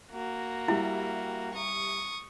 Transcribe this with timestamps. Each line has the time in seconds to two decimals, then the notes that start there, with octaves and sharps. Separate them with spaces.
0.11 A#3 F#4
0.68 G3 E4 G4 E5
1.54 C#6 D#6